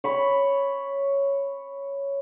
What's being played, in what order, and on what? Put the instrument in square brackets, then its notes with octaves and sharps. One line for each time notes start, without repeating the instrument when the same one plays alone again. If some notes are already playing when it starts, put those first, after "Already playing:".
[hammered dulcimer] C#5 B5